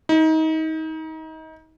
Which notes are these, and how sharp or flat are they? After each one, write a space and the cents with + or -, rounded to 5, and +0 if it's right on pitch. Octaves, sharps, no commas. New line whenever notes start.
D#4 +30